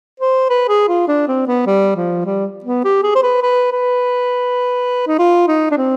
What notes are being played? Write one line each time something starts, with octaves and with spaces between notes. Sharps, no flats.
C5
B4
G#4
F4
D4
C4
B3
G3
F3
G3
B3
G4
G#4
C5
B4
B4
B4
D#4
F4
D#4
D4
C4